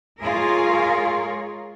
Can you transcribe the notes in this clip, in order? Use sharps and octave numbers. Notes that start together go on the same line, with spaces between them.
G#3 F4 G#4 A#4 C#5